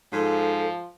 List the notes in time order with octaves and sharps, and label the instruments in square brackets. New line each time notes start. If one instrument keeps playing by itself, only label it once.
[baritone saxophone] G#2 [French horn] F3 [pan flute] A4